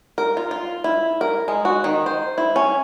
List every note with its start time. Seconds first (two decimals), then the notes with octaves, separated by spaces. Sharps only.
0.18 A#4
0.37 F4
0.51 F4
0.84 E4
1.21 A#4
1.48 G#3
1.65 F#4
1.84 D#3
2.06 C5
2.38 E4
2.56 C#4